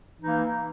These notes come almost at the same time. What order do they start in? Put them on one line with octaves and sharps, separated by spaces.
E3 D#4 A#3